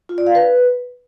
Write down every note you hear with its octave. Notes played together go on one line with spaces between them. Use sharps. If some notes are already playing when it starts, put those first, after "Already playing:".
F4
D5
F5
B4